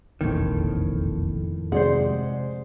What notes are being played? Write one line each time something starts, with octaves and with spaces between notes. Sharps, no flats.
E1 A#1 F2 A2 D#3
C3 G#3 C5 D5 F#5